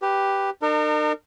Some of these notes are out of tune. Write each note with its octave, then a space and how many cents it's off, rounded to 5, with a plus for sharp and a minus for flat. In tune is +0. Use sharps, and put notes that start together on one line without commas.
G4 +0 B4 +0
D#4 -45 A#4 -30